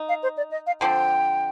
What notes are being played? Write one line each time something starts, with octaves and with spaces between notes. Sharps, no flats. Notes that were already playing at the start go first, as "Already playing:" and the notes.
Already playing: D#4
F5
C5
D5
D#5
F5
D3 F3 C4 G5